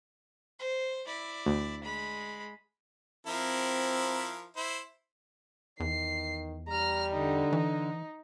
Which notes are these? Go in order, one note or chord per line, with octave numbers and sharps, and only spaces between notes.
C5
E4 D5
D2
G#3 B5
F3 C4 E4 A#4
E4 C5
E2 D#3 C7
G3 A#5 F6
D3 D#4
E3